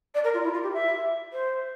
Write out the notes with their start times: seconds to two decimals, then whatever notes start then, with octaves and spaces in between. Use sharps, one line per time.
0.15 D5
0.24 A#4
0.34 F4
0.44 E4
0.53 F4
0.63 G4
0.73 E5
1.33 C5